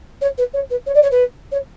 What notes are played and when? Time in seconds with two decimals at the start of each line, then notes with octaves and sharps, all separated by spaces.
0.21 C#5
0.38 B4
0.53 C#5
0.70 B4
0.86 C#5
0.94 D5
1.02 C#5
1.11 B4
1.51 C#5